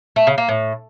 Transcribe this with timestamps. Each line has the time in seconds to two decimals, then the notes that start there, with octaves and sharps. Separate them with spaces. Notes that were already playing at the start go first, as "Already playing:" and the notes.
0.16 A3
0.27 C#3
0.38 A#3
0.48 A2